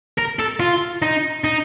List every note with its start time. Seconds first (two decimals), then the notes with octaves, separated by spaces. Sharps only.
0.18 A#4
0.39 A4
0.60 F4
1.02 D#4
1.44 D#4